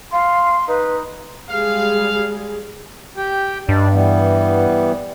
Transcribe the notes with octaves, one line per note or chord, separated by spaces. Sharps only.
F5 C6
D#4 B4
G3 G#3 G#4 F5
G4 G5
G2 D4 D#4 D5
E3 G3 B3